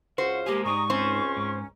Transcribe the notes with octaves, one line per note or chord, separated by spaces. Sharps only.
C#2 F#4 C5 F5
G#3 A#3 G4 G#4
G#2 G3 D#4 A#5 C#6 D#6
C#2 C4 C#4 C5
G#2